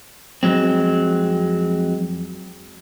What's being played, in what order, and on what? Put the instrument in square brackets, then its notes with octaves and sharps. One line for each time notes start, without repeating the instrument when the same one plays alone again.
[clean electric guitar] F2 F#3 G#3 C4